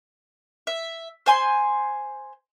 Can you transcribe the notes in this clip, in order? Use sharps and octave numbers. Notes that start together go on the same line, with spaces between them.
E5
C5 G#5 C6